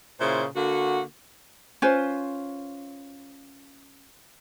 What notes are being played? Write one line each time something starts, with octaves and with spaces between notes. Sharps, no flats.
A#2 C#3 E4 C5
D3 A#3 F#4
C#4 F4 B4 C5